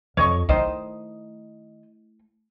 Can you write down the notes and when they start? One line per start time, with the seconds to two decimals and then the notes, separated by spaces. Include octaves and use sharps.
0.17 F2 C#5 D#5 C#6
0.49 D#3 A3 E4 C5 D#5